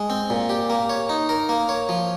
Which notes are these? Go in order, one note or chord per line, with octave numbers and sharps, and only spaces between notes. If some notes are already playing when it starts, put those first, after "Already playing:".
Already playing: G#3
C4
A#2
G4
A#3
C#5
D#4
A#4
A#3
C#5
F3